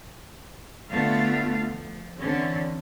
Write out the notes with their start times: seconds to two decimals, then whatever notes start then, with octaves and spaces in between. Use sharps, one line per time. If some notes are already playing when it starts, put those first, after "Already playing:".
0.90 D3 A3 B3 F4 F5
1.69 F3
2.19 D3 E3 C4 C#4